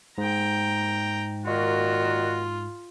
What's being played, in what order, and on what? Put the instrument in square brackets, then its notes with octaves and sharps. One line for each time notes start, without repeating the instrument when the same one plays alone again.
[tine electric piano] G#2 [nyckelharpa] G5 A#5
[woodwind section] A#2 D#3 F#4 [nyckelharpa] F4